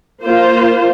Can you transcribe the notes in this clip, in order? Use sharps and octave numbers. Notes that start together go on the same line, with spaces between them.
A#3 F4 C5